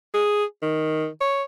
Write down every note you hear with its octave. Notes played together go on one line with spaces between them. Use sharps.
G#4
D#3
C#5